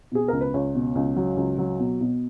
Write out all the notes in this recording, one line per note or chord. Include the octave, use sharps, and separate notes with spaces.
B2 G#4
C#2 A#4
B4
C#2 C#5
B2
C#2
F#3
C#2
F#3
B2
B2